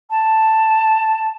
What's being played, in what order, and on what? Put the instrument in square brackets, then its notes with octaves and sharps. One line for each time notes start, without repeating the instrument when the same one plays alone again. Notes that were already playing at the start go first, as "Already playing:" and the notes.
[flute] A5